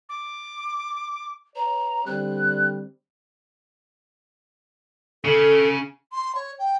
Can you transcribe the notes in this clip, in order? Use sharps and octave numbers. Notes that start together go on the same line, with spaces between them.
D6
B4 C#5 A#5
D3 G3 C4 F#6
C#3 A4
C6
C#5
G5